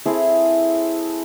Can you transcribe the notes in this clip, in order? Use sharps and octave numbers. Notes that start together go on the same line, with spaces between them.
C4 E4 G#4 A4